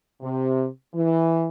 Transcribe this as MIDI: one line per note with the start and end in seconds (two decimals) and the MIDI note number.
0.21 0.67 48
0.94 1.49 52